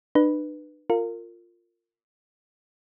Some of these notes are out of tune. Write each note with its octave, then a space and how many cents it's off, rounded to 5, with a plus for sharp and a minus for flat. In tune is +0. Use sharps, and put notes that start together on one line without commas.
D4 +45 B4 +0
F4 +0 A#4 -30